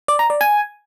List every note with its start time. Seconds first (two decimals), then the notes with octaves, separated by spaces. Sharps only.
0.08 D5
0.19 A#5
0.30 D5
0.41 G#5